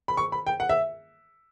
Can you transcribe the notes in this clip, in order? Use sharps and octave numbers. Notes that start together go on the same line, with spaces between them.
B5
C#6
B5
G5
F#5
E5